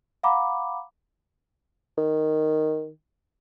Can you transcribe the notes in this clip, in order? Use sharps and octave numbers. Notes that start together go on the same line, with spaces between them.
F5 F#5 A#5 B5 D6
D#3